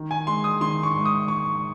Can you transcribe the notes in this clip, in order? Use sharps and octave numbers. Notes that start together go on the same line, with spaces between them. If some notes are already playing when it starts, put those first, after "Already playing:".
Already playing: D#3
G#5
G#3 C6
D#6
D#3 C6
C#6
G#2
D#6
G#2 C#6